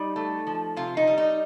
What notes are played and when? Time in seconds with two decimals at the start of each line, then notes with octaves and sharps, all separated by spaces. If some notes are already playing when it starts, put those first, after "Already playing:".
Already playing: G3 D#4
0.16 A3
0.47 F3
0.76 C3 F4
0.97 D#4
1.07 G3
1.18 D#4